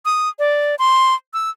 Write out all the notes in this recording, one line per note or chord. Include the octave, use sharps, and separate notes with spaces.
D#6
D5
C6
E6